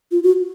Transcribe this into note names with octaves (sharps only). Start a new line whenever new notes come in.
F4
F#4